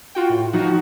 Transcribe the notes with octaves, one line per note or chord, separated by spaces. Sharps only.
F4 F#4 G5
A2
F3 D#4 F#4